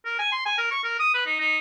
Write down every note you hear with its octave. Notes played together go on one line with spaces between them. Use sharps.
A#4
G#5
C6
G#5
A#4
C#6
A#4
D#6
B4
D#4
D#4